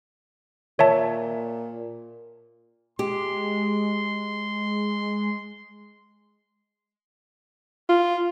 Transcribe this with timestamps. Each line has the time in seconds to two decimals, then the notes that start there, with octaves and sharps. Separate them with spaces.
0.79 A#2 C#5 E5 A5
2.99 G#3 G4 C6
7.89 F4